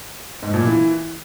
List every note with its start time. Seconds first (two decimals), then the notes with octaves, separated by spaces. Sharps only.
0.43 G#2
0.54 A#2
0.65 E3